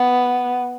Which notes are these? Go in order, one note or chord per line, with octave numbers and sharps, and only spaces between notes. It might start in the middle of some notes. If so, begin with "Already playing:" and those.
Already playing: B3